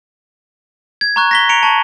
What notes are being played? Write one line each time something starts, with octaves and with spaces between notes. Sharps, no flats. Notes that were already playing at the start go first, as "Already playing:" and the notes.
G#6
A#5 C#6 F#6
A#6 B6 G7
A#5 C#7 D7 F7
A5 C#6 F#7